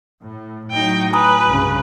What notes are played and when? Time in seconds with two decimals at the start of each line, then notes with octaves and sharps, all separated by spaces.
0.21 A2
0.71 A2 F#3 D#4 G5
1.13 B4 G#5 A#5 D#6
1.47 C2 G2 C#3